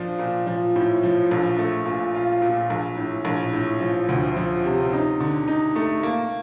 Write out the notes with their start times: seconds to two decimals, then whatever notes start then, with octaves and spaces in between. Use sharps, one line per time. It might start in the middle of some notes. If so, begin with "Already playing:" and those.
Already playing: A#2 F3 D4
0.19 A#2
0.47 F3
0.76 A2
1.03 F3
1.31 A#1
1.59 A3
1.86 A#2
2.15 F4
2.42 A#2
2.70 A#1
2.97 A2
3.25 A#1
3.53 A2
3.81 F3
4.09 D2
4.36 F3
4.65 C3
4.93 D#4
5.20 D3
5.48 D#4
5.76 A3
6.03 A#3